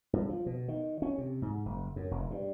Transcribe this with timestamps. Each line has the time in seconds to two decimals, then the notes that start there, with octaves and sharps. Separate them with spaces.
0.13 G2
0.29 F3
0.46 B2
0.68 D#3
1.02 C#4
1.18 C3
1.42 G#2
1.66 F#1
1.96 F#2
2.11 F1
2.31 G2